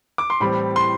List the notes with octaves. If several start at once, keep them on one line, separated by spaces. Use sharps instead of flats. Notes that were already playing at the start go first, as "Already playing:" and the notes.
D6
C6
A2 E3 G3 C4 B5
C6